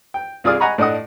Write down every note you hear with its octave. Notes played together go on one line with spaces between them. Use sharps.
G5
C2 F4 G#4 D5 D#6 F6
D#5 F#5 G#5 A#5 B5 C#6
A2 D4 D5 D#5 F#5 D#6